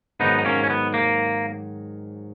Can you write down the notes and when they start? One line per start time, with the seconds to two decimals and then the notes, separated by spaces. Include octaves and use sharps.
0.20 G#2 D#3 F#3 B3 D#4
0.38 D#4
0.45 A#3 C#4
0.64 C#4
0.70 B3
0.94 A#3